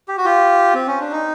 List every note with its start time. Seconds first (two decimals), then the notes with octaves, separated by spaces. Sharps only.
0.08 G4
0.18 F#4
0.25 F4 G4
0.74 C4
0.87 C#4
1.00 D4
1.12 D#4